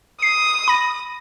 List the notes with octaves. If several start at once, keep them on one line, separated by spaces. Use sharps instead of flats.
D#6 C7
B5 A#6